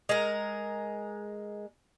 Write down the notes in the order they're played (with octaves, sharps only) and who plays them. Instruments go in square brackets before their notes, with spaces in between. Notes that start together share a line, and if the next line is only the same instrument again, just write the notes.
[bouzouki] G#3 A#4